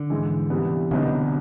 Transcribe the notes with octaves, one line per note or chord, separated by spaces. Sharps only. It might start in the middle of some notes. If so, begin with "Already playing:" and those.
Already playing: D3
G#2 E3 G#3
C3 E3 G3 B3
C2 B2 D3 F#3 B3 D#4